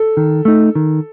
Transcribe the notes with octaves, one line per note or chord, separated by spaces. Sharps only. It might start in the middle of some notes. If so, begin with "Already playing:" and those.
Already playing: A4
D#3
A3 D#4
D#3